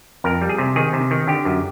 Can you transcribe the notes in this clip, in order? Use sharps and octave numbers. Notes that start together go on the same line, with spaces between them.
F2 A#4
G3
G#4
C3
D#3 G#4
C3
D#3
D3 G4
F#2